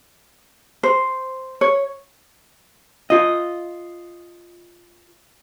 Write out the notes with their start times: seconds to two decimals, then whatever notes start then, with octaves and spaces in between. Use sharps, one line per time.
0.83 C5
1.61 C#5
3.10 F4 D#5